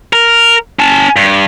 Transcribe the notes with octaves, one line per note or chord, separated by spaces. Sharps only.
A#4
C#4 A5
G2